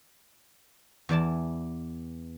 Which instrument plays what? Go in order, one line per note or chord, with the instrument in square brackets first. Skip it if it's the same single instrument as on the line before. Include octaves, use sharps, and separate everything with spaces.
[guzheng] E2 E3 D5 A5